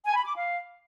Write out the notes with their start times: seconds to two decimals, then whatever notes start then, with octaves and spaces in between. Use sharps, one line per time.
0.05 G#5
0.15 B5
0.25 D6
0.34 F5